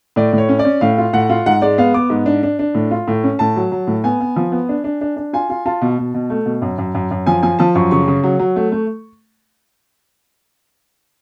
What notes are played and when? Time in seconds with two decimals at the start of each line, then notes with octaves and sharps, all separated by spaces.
0.16 A2 D5
0.33 A2
0.38 C#5
0.49 C#4
0.59 D5
0.65 C#4
0.81 A2 F5
0.98 F4
1.13 A2 F#5
1.29 F4
1.46 G#2 F#5
1.62 G#3 D5
1.78 B3 F5
1.94 B3 D6
2.10 G#2
2.26 D4
2.43 D4
2.59 D4
2.75 A2
2.91 F4
3.08 A2
3.24 C#4
3.39 A2 A5
3.56 F#3
3.72 F#3
3.87 A2
4.04 B3 G#5
4.20 B3
4.36 F3
4.52 B3
4.69 D4
4.84 D4
5.01 D4
5.16 D4
5.33 F4 G#5
5.50 F4
5.66 F4 A5
5.82 B2
5.98 B2
6.14 B2
6.30 A3
6.46 B2
6.62 F#2
6.78 F#2
6.95 F#2
7.11 F#2
7.26 F3 G#5
7.43 F3 G#5
7.59 F3 A5
7.75 F#2 C#6
7.91 C#3 C#6
8.08 C#3
8.24 F#3
8.39 F#3
8.56 A3
8.72 A3